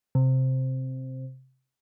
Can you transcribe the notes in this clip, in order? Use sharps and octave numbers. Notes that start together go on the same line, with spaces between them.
C3